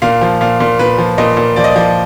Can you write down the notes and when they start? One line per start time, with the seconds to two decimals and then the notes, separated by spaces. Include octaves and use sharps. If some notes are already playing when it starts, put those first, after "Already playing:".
0.02 A#2 F5
0.21 F3
0.41 A#2 F5
0.60 A#2
0.79 A#2 B4
0.99 F3
1.18 A#2 D#5
1.37 A#2
1.56 F3 D5
1.64 D#5
1.71 F3 D5